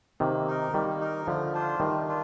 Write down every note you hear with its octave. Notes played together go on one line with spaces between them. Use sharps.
C3 D#3 A#3
D#4 A#4
D#3 G3 A#3
D#4 A#4
D3 F3 A3
D4 F4 C5
D#3 G3 A3
D4 F4